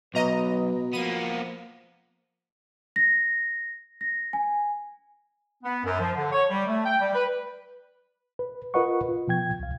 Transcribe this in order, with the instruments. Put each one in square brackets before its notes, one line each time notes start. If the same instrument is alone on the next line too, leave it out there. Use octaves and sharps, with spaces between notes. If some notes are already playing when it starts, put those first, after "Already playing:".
[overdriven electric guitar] B1 [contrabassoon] B2 [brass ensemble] B4 [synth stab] D#5 A#5
[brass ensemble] F3 [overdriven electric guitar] A#3 B3 [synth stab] D#7
[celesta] A#6
A#6
G#5
[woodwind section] B3
F#2
F3
D3
C#5
G3
A3
G5
G3
B4
[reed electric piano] B4
F4 A#4 B4 D#5 F#5 C#6
F4
B2 F3 G5 G#6
C2 F5